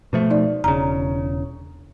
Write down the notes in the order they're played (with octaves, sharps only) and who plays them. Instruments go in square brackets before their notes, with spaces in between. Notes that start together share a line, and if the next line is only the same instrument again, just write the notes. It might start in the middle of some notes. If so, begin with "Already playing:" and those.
[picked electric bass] B2 F3 A3
[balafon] D#4 D5
[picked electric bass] E1 C#3 [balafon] A#5